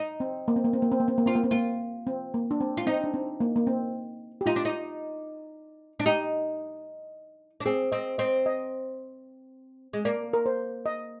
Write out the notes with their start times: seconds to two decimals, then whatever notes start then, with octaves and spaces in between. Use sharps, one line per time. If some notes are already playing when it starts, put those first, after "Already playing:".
Already playing: D#4
0.20 C4
0.48 A#3
0.56 C4
0.65 A#3
0.73 C4
0.82 A#3
0.92 C4
1.00 A#3
1.08 C4
1.18 A#3
1.26 C4 F4
1.35 A#3
1.44 C4
1.51 A#3 F4
2.07 C4
2.34 A#3
2.51 D4
2.61 C4
2.77 F4
2.86 C4 D#4
3.04 D4
3.14 C4
3.40 A#3
3.56 A#3
3.67 C4
4.41 G4
4.46 D#4 F4
4.56 D4
4.65 D#4
5.99 D4
6.06 D#4 G4
7.60 D4
7.65 C4 G#4
7.92 C4 D#5
8.18 C4 D#5
8.46 D#5
9.93 G#3
10.05 A#3 D5
10.33 A#4
10.46 C5
10.86 D#5